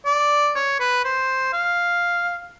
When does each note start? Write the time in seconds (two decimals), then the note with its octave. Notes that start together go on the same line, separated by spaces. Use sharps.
0.06 D5
0.55 C#5
0.80 B4
1.05 C5
1.53 F5